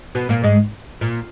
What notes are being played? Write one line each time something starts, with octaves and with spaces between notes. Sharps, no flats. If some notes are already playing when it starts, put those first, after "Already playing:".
B2 B3
A#2 A#3
G#2 G#3
A#2